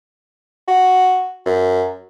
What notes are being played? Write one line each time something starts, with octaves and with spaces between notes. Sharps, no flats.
F#4
F#2